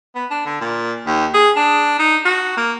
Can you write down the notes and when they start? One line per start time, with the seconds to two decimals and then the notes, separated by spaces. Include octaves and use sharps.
0.15 B3
0.31 D4
0.46 D3
0.61 A#2
1.06 D#2
1.34 G#4
1.56 D4
1.99 D#4
2.25 F#4
2.57 A#3